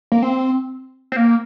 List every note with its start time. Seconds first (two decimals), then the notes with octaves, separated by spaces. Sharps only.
0.12 A#3
0.22 C4
1.12 C4
1.16 A#3